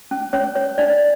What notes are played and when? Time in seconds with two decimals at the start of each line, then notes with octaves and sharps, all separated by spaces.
0.11 C#4
0.33 C#4 C#5
0.55 C#5
0.78 D4 D5